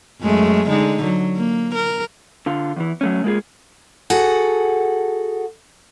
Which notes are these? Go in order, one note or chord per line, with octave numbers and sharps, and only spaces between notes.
F#2 G#3 A3
D3 G#3 D#4
F#3
A#3
A#4
D3 F4
E2 E3
F#3 A3 C#4
G#3 A#3 F4 G#4
F#4 G#4 A4 F#5